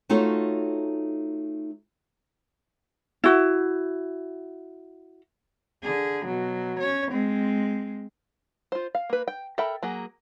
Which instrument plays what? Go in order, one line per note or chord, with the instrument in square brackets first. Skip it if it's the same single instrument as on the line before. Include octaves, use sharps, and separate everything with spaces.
[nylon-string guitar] A3 D#4 F4 F#4 A4 C#5
[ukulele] E4 F#4
[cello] D3 G#4
B2 F#3
C#4 C#5
G#3 C4
[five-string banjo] F4 C5
F5
A#3 B4
G5
A4 A#4 E5 G5 B5
F#3 A#3 G#4